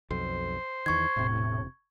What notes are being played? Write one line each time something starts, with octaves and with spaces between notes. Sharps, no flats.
B1 F2 C5
E2 D#3 C#6 G#6
E1 A2 C3